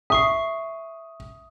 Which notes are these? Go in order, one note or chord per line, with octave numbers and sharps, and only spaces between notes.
E5 C#6 D#6 C7